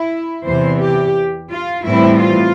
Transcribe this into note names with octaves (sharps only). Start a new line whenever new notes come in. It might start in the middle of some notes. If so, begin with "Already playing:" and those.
Already playing: E4
E2 C3 E3 C5
G4
F4
A2 E3 G3 C4 E4
F4